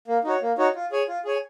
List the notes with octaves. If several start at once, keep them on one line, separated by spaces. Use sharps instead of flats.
A#3
D#4 F#4 C#5
A#3
D#4 F#4 C#5
F4
G#4 C#5 G#5
F4
G#4 C#5 G#5